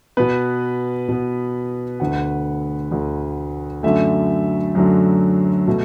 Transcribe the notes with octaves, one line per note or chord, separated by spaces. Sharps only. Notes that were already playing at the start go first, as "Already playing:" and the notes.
B2 B3 B4
B2 B3
D2 D3 A3 F#5
D2 D3 A3
F#2 D3 F#3 A3 E5
F#2 D3 F#3 A3
B2 A3